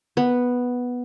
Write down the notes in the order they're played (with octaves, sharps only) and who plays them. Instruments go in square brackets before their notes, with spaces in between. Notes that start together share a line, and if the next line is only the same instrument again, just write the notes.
[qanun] B3